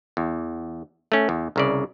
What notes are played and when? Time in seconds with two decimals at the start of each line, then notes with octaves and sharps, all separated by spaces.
0.17 E2
1.12 A3 C#4
1.29 E2
1.56 C2 C#3 D5